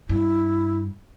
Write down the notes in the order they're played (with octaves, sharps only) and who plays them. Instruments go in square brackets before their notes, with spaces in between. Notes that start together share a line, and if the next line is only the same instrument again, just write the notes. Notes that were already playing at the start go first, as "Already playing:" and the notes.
[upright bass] G2 [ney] E4